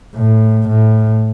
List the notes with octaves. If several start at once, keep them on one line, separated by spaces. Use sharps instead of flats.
A2
A2